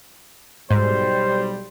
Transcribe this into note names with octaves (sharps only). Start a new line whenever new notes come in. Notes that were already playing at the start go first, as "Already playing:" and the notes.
B1 G#2 G3 C5